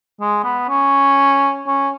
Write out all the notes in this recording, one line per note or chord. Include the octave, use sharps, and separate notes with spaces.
G#3
B3
C#4
C#4